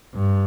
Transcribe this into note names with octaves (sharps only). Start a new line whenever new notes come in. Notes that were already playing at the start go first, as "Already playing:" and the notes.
G2